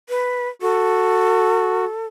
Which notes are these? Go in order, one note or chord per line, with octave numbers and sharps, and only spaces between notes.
B4
F#4 A4